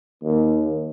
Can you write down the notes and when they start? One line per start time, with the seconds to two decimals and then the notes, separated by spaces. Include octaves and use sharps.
0.23 D#2